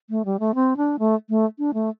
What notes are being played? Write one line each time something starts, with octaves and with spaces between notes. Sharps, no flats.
A3
G3
A3
C4
D4
A3
A3
D4
A3